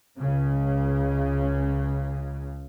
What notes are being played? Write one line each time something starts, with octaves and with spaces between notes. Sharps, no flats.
C#2 C#3